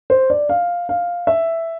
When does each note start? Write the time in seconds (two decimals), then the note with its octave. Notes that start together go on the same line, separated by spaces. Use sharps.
0.10 C5
0.30 D5
0.49 F5
0.89 F5
1.27 E5